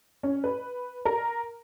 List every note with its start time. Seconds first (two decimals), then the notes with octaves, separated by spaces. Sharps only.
0.23 C#4
0.44 B4
1.05 A#4